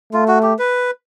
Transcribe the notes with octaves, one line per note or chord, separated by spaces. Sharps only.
A3 F4
F#4
G4
B4